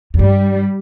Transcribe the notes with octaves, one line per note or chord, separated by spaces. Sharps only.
F2
G2 G3